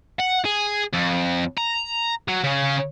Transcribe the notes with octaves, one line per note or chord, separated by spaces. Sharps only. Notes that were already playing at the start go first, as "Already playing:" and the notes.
F#5
G#4
F2
A#5
F#3
C#3 C#4